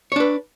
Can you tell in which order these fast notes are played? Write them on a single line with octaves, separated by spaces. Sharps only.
C#5 D4 B4